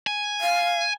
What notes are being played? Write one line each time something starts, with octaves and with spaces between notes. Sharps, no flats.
G#5
F5